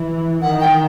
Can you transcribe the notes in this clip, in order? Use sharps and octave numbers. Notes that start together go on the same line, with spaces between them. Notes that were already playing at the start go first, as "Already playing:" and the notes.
Already playing: E3
D#3 F#5
G5